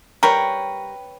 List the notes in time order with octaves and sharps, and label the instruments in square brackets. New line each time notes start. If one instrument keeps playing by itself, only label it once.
[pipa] G3 A#4 [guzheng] B4 C#5 G5